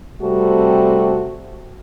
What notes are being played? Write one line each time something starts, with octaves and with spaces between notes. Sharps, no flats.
C3 G3 A3 C4 F#4 A4